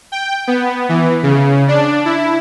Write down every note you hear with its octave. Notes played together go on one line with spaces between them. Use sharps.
G5
B3
E3
C#3
D4
E4